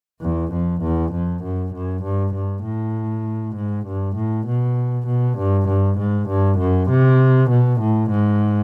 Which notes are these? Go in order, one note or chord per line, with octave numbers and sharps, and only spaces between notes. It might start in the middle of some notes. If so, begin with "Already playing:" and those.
E2
F2
E2
F2
F#2
F#2
G2
G2
A2
G#2
G2
A2
B2
B2
G2
G2
G#2
G2
F#2
C3
B2
A2
G#2